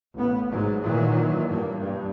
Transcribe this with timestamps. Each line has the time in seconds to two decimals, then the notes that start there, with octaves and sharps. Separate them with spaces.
0.14 A1 B3
0.51 G#2 F#3
0.82 A#2 D#3 E3 F#3
1.48 G2 A#3
1.79 G2